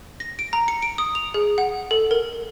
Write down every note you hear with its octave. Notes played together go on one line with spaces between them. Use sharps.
A#6
D7
A#5
C#7
D7
D#6
F7
G#4
F#5
A4
A#4